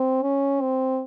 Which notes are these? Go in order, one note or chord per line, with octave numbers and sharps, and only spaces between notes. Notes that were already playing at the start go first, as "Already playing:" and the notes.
Already playing: C4
C#4
C4